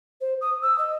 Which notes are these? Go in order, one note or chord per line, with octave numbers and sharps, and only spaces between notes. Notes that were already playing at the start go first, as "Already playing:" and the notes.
C5
D#6
E6
D#5